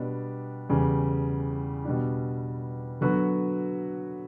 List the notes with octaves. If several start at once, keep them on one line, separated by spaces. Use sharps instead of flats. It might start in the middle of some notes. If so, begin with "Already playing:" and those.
Already playing: B2 G3 B3 D4
E2 C#3 G3
B2 G3 D4
D3 F#3 B3 F#4 B4